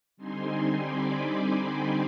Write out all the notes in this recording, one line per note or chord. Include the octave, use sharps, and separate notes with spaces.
D3 G3 C4 D#4 G#5 C6
B5 D6